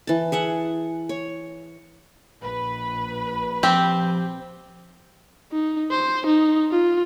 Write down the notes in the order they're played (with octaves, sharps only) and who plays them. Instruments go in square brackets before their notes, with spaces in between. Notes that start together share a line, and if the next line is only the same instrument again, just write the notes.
[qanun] E3 A5
G#4 E5 F#5
C#5
[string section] A#1 B4
[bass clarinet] F3 [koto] C4 [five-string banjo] G4
[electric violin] D#4
C5
D#4
F4